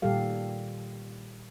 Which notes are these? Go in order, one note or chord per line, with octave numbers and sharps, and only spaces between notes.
A#2 D#3 G3 G4 A4 F5